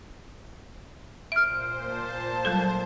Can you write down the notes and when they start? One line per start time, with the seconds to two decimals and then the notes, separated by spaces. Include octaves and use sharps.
1.32 A#2 C5 E5 F6 D7
1.94 A5
2.45 F#3 G3 A4